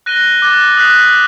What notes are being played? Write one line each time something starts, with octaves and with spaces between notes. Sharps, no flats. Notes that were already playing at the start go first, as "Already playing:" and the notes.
F#6 A#6 D#7 G7
D6 F#6 A6
D#6 F#6 B6